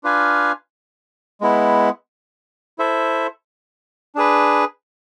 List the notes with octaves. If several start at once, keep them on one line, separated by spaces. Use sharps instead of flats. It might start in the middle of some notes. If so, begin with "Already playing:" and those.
D4 F4 B4 F5 G#5
G#3 B3 E4
E4 A4 C5 E5
D4 G#4 B4